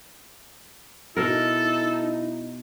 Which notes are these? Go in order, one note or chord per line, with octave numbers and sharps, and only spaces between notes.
B2 D#4 E4 A4 A#4